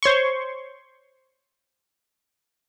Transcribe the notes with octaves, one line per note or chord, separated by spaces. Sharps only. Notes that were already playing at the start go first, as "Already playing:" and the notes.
C5 C#5 C6 C#6